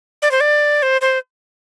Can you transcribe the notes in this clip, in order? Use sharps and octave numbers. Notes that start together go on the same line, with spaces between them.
D5
C5
D5
C5
C5